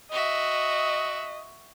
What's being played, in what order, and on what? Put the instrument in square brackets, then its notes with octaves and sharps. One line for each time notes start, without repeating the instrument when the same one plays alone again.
[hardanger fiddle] F#4 E5 [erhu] D#5